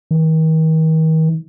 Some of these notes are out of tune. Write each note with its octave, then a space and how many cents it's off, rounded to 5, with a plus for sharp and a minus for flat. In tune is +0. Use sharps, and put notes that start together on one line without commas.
D#3 +40